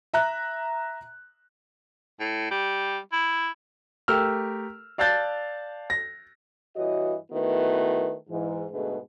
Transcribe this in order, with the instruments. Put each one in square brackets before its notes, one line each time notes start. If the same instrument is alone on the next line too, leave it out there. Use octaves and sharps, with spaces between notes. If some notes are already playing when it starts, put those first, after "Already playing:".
[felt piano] E5 A#5 F#6
[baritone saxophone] A2
G3
E4
[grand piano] A3 G4 A#4 E6 F6
D5 F5 A5 F#6 G6 A6
A#6
[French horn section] G2 E3 F#4 C#5 D#5
D#3 A3 B3 E4 F#4 B4
G#2 E3
G#2 B2 D3 A3 G#4 B4